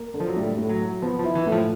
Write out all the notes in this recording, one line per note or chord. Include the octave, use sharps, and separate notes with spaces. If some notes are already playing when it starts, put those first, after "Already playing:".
Already playing: A#3
D3
F3
F#3
A2 G3
A2
F#3
F#3
F3 B3
F3
E4
E3
A2
F3